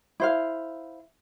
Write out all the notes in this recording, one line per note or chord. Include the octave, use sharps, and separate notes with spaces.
E4 C5 F5